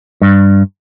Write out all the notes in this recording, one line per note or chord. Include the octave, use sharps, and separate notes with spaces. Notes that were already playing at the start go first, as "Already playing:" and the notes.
G2